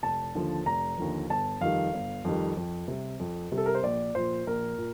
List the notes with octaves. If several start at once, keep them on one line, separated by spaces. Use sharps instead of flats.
F1 A5
D#2 D3 F3
F1 A#5
D#2 D3 F3
G1 A5
F2 D#3 G3 F5
G1
F2 D#3 G3
F2
C3 G3
F2
C3 G3
A4
A#4
C5
A#1 D5
A#2 F3 C5
A#1 A#4
A#2